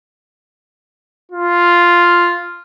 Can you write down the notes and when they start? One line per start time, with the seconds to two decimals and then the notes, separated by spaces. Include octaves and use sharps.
1.32 F4